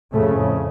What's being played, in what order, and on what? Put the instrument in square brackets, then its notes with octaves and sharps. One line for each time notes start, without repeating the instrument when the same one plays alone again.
[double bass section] F2 A2 C#3 A3